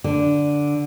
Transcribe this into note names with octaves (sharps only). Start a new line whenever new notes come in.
D3